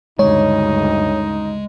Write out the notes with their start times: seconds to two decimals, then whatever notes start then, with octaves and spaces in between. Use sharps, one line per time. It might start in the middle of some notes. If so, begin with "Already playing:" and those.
0.19 D2 G2 C#3 G#3 D#4 C#5